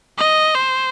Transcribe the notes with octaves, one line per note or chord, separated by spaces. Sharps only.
D#5
C5